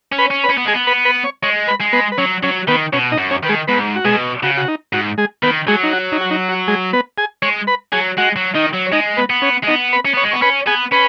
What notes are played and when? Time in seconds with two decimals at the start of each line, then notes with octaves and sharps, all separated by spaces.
0.12 C#4
0.18 B4 B5
0.30 C#4
0.44 B4 B5
0.49 C#4
0.57 B3
0.66 G#3 G#4 G#5
0.73 B3
0.87 B4 B5
1.05 B4 B5
1.24 C#5 C#6
1.42 G#3 C#5 C#6
1.67 B4 B5
1.80 G#3
1.93 B3 B4
2.12 B4
2.18 F#3 C#4 C#5
2.43 F#3 C#4 C#5
2.68 D#3 B3 B4
2.92 B2 C#4 C#5
3.12 D#4 D#5
3.18 F#2
3.31 C#4 C#5
3.43 D#3 B4
3.49 G#3 G#4
3.67 G#2 B3 B4
3.95 F#4
4.05 B2 G#3 G#4
4.43 C#3 F#4
4.57 F#4
4.68 D#4
4.93 G#2 F#4
5.18 G#3 G#4
5.43 D#3 B3 B4
5.67 F#3 G#3 G#4
5.83 D#4
5.93 F#4
6.12 D#4
6.21 F#4
6.31 D#4
6.49 F#4
6.68 G#3 G#4
6.93 B3 B4
7.18 G#4 G#5
7.42 G#3 C#5 C#6
7.67 B4 B5
7.92 F#3 G#4 G#5
8.17 G#3 F#4 F#5
8.36 F#3
8.55 D#3 D#4 D#5
8.74 F#3
8.87 C#5
8.92 G#3 D#4 D#5
9.17 B3 B4
9.30 B3
9.42 C#4 C#5
9.63 G#3
9.67 B3 D#4 D#5
9.92 B4 B5
10.05 C#4
10.14 B3 C#5 C#6
10.24 G#3
10.31 B3 C#6
10.42 C#4 B4 B5
10.67 B3 G#4 G#5
10.92 C#4 B4 B5